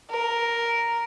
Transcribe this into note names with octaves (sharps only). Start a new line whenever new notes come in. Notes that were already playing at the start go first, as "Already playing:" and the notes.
A#4